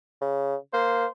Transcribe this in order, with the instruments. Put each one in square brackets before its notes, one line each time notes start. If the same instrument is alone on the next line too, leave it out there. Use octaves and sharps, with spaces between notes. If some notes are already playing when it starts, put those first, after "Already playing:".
[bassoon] C#3
[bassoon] A#3 [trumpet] C5